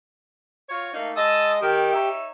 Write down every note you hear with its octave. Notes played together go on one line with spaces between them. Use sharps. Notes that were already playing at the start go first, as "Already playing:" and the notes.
F4 F#4 C#5
A3 A#3 D#4
G#3 D#5 A5 D#6 E6
D#3 G4 G5
D#4 C#5 E5